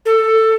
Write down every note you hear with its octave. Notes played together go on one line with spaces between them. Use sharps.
A4